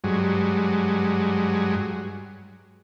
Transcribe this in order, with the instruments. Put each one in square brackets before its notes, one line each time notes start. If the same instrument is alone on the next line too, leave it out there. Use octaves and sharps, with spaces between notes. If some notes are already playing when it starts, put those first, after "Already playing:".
[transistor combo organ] G2 F#3 G#3